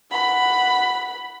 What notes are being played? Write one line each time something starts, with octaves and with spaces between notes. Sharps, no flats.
F#5 B5